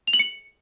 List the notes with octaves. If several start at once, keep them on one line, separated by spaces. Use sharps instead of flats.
F7
F#7
C#7